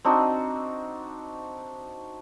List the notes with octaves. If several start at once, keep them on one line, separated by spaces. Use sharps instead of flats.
C4 D4 D#4 F#4